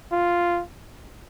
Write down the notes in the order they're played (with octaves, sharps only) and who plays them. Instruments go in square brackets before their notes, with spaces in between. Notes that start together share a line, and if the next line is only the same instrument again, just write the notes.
[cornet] F4